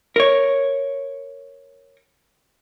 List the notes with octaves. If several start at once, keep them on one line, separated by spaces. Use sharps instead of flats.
A#4 C#5